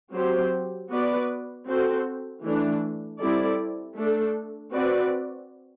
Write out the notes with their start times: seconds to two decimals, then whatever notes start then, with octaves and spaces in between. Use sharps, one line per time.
0.13 F#3 C4 G4 C5
0.90 B3 F#4 B4 D5
1.66 C4 F#4 A4 C5
2.43 E3 A3 D4
3.19 G3 C4 E4 A4 D5
3.96 A3 D4 A4
4.73 C4 F#4 B4 D5